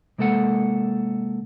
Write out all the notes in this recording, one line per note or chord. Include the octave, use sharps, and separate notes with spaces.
C3 G#3 A#3 A4 C5 F#5